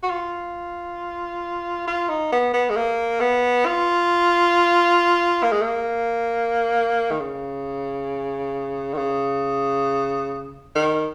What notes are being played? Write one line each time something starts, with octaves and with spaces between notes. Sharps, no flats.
F#4
F4
F4
D#4
B3
B3
G#3
A#3
B3
F4
A#3
G#3
A#3
D#3
C#3
D#3
C#3
D#3